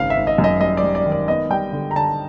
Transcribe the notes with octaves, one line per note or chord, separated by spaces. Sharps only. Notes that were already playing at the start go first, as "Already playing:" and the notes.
Already playing: G#1 C#3 F5
E5
G#1
D#5
F#2
D#5
G3 D#5
D5
G3
D5
D#3
D5
B3 D#5
G3 G5
D3
A#5
D3 A5